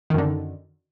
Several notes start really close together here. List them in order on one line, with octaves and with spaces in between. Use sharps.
D#3 F#2 D3